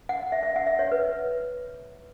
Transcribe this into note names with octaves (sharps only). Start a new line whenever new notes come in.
F#5
E5
E5
F#5
E5
C#5
B4